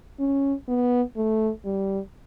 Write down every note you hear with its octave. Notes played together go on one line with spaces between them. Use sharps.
C#4
B3
A3
G3